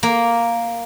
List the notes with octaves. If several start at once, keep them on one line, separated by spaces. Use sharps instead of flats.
A#3